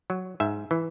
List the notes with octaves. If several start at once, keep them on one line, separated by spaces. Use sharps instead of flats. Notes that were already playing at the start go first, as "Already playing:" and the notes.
F#3
G#2 E5
E3